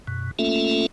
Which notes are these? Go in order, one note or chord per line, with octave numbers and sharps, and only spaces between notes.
F#2 B2
A3 A#3 C#4 F4 A4 E5